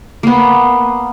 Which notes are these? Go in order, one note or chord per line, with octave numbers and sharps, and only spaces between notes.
A#3 B3